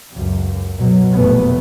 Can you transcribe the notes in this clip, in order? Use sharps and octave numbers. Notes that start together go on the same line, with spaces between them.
C#2 F#2
F#2 B2 F#3
F1 A#2 A3 B3